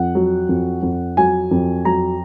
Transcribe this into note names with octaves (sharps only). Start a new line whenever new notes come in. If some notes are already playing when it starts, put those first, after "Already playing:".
Already playing: F2 F#5
F#3
F2
F2
F#3 G#5
F2
F#3 A#5